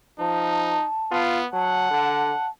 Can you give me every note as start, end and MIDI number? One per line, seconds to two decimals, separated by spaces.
0.20 0.78 53
0.20 0.87 63
0.20 1.18 81
1.12 1.47 59
1.12 1.40 65
1.53 1.89 54
1.53 2.48 78
1.53 2.49 81
1.91 2.33 50